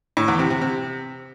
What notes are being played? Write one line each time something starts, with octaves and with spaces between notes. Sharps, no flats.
A2
E2
C3
C3
C3